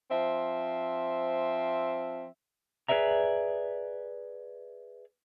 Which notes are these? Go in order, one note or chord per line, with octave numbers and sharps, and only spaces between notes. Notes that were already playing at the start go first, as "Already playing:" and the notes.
F3 C4 E5
G#4 A#4 B4 D5 E5 A#5